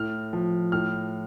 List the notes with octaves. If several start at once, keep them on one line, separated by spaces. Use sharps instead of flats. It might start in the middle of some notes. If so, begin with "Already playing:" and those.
Already playing: A2 F6
F3
A2 F6